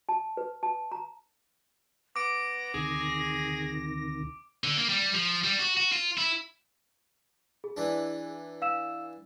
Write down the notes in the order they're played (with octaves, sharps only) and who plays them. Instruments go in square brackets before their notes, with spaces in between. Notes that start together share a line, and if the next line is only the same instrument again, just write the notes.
[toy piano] A5
B4
A5
A#5
[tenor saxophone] B3 [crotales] D6 D7 [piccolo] A#6
[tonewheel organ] D2 C3 D#3 [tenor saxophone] G#4
[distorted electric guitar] D3
A#3
G3
F3
G3
F#4
F#4
F4
E4
[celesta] G#4
[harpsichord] E3 D4
[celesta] F5 E6 E7